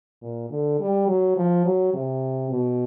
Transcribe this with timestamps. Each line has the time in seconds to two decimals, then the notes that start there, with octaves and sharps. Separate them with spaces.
0.22 A#2
0.50 D3
0.80 G3
1.08 F#3
1.36 F3
1.65 F#3
1.94 C3
2.51 B2